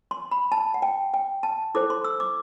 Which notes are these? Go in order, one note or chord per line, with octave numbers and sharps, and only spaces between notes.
C6
B5
A5
F#5
G5
G5
A5
E4 A4 C5 D6
C6
E6
D6